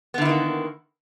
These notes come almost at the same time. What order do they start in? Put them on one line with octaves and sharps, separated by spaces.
B3 D3 E4 D#3 A#3